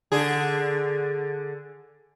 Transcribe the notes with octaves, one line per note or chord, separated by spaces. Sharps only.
D3 G#4